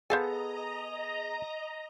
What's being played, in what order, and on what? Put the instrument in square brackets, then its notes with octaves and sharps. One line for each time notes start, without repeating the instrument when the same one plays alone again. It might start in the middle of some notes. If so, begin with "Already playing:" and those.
[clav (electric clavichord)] B3 A4 [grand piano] G#4 [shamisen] C5 F5 G#5 [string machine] D#5 A#5